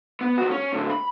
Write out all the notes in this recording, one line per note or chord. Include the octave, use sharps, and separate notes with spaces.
B3
F3 F#4
C#4
A2 D3
B5